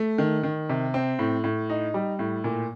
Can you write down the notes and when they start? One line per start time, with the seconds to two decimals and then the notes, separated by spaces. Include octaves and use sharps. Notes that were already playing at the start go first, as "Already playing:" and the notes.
Already playing: A3
0.18 D#3
0.43 D#3
0.69 C3
0.94 C4
1.19 A2
1.44 A2
1.70 D#4
1.94 G3
2.19 A2
2.44 A#2